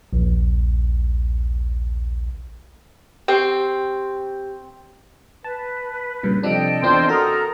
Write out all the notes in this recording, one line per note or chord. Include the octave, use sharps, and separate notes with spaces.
A#1 D#2
C4 G4
B4 A5
G2 A#2 C#3
C3 F3 D4 A4 D#5 G5
E2 C4 D4 F4 C5
F#4 A4 A#4 A#5 D#6 F6